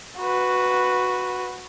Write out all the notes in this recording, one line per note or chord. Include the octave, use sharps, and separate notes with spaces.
F#4 B4